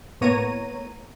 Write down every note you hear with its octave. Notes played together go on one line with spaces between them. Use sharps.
A2 A#3 B3 C#5 A#5 D#7